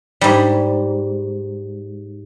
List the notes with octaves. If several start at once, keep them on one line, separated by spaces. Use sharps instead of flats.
G#2 G3